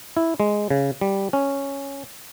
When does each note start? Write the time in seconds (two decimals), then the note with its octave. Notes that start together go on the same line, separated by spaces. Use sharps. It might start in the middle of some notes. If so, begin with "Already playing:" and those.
0.17 E4
0.40 G#3
0.70 C#3
1.01 G3
1.33 C#4